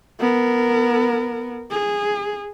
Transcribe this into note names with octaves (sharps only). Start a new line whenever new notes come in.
B3 A#4
G#4